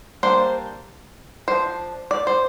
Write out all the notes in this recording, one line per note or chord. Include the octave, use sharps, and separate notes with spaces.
G3 A#3 D4 C5
F3 D4 C5
D5
C5